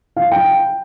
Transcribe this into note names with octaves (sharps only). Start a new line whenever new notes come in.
F5
G5